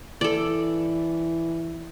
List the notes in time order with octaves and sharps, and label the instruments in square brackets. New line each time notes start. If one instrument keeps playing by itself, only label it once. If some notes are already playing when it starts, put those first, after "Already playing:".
[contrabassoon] E3 [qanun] A4 D5